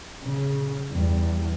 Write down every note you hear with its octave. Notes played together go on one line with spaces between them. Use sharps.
C#3
E2 G3